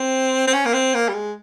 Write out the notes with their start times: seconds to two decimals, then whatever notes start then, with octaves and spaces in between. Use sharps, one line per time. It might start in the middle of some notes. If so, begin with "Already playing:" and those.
Already playing: C4
0.47 C4
0.53 C#4
0.66 A#3
0.74 C4
0.95 A#3
1.09 G3
1.14 G#3